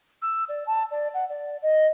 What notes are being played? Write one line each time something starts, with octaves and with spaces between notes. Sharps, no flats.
E6
D5
A5
D5
F#5
D5
D#5